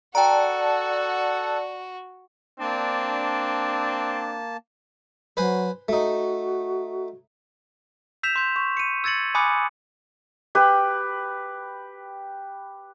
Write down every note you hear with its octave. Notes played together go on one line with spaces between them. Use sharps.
F#4 A4 D5 F#5 G5 A5 A#5
A#3 C4 D4 A5
F#3 B4 C5 G#5
A3 D#4 F#4
E6 G6 B6 E7 F7
C6 G6
C#6
C#7 D#7
E6 G#6 A6 C#7 F#7
G#5 B5 D6 D#6 F#6 C#7
G4 B4